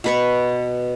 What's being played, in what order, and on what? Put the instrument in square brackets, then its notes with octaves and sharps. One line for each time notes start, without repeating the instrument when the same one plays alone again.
[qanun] B2 B4 C#6